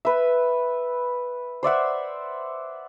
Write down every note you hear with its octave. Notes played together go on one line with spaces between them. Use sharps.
B4 E5
C5 D5 E5 F#5